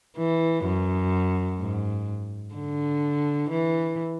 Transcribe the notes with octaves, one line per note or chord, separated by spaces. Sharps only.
E3
F#2
G#2
D3
E3